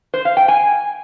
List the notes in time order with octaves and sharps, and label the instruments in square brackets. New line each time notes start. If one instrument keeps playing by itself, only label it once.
[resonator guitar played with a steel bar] C5
F5
G5
G#5